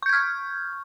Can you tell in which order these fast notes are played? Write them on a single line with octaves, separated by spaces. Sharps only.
C#6 G6 G#6 F6